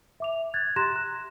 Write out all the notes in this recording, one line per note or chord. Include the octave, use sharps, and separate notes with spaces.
E5 D6 F7
F#6 G#6 A6
G4 A#5 C6 F#6 A#6 E7
F#6